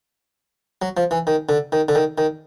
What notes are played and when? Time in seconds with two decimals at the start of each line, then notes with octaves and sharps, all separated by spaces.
0.82 F#3
0.97 F3
1.11 E3
1.27 D#3
1.49 D3
1.72 D#3
1.88 D3
1.95 D#3
2.18 D#3